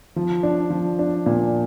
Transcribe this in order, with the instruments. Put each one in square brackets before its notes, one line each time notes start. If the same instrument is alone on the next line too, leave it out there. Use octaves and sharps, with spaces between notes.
[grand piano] F3
D4
F3
D4
A#2